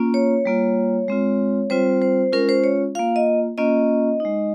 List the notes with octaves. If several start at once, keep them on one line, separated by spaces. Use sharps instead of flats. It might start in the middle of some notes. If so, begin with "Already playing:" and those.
Already playing: A#3 C#4 F4
C#5
G3 A#3 F4
G#3 C4 F4
G3 C4 F4 C5
C5
G#3 C#4 F4 A#4
C5
C#5
A#3 F4 F5
D#5
A#3 C#4 F4 D#5
G#3 D#4